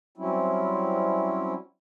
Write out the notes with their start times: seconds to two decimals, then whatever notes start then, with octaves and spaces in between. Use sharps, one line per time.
0.18 F#3 G3 C4 C#4 E4